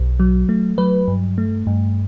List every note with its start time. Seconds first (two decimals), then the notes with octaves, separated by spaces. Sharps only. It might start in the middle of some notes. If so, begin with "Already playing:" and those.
Already playing: B1
0.20 F#3
0.49 A3
0.78 F#3 B4
1.08 G2
1.38 A3
1.67 G2